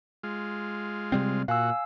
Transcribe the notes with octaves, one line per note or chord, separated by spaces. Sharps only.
G#3 F4
C3 G3 C4
A#2 F#4 F5 G#5 E6